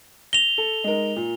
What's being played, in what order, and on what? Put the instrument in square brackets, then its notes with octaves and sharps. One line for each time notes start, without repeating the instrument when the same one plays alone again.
[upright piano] A#6 [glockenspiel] F7 G7
[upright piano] A4
G#3 D#4 A#4
A#2